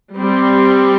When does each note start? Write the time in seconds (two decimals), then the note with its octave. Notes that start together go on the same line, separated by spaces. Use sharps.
0.16 G3 C4